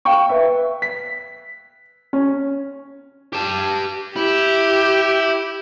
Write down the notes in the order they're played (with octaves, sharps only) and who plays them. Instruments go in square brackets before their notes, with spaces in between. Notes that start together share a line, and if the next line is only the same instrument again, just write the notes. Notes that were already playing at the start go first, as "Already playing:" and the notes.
[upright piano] F5 G5 C#6
B4 E5
B6
C#4
[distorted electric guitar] G4 A5
[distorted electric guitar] E4 [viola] G4